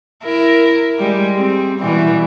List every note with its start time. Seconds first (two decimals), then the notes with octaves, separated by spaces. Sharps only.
0.24 E4 A#4
0.99 G3 G#3
1.36 C4
1.79 B2 E3 G3